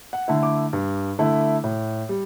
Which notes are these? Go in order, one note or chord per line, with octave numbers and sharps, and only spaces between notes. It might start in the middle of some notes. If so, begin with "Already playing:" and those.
F#5
D3 A3 E4
D6
G2
D3 A3 E4
A2
G3